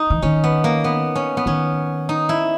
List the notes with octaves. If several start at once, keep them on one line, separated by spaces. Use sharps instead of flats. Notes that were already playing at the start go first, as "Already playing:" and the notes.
Already playing: D#4
E3
D#3 C#4
B3
A#3
B3
C#4
B3
D#3 C#4
D#4
E4